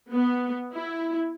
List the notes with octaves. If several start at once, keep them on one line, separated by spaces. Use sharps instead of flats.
B3
E4